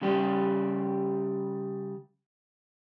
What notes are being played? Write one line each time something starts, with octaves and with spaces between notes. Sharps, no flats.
C#3 G3 G4